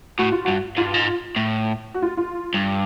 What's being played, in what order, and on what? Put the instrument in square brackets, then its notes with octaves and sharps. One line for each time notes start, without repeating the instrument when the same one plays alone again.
[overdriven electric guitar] A2 [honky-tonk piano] F#4
[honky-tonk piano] F4
[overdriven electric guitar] G2 [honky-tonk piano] F#4
[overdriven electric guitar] G#2 [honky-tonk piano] F4
[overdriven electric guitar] G2
G#2
A2
[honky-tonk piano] F#4
F4
F4
[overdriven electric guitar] G2